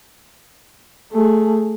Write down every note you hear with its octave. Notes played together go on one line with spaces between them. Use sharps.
A3 G#4